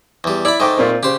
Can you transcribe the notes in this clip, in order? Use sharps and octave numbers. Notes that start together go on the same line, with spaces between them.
E2 G3
E4 D5 E5 B5
G#2 A3 D#5 G5 D6
A#2 A#3 C4
C#3 G4 C5